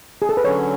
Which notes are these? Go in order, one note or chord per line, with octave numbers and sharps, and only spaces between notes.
G#4
A4
B4
D3 F#3 C#4 C#5